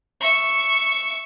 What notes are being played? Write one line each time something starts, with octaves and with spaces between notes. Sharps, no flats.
E5 C#6